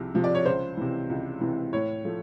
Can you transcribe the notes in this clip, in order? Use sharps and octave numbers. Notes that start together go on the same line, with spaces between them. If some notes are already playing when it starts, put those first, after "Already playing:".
Already playing: C2 C3 F3
C3 F3
D5
C#5
C#2 C5
C3 E3
C#2
C3 E3
A2 C#5
F3 A3